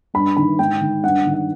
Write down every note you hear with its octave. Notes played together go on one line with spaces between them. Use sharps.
G2 B5
D#3 B5
G#2 G5
D#3
G2 F#5
D#3
F#5